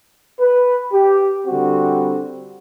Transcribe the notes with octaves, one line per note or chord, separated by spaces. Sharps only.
B4
G4
D3 G3 C4 F#4